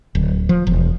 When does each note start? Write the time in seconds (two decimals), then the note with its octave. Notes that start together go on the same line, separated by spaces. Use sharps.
0.15 D1
0.49 F3
0.67 E1